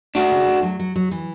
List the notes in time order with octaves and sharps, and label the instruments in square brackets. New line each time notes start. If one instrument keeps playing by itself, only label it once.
[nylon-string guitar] A3 [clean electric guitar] D4 F#4
[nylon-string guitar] C#3
A3
F#3
F#3
F#3
E3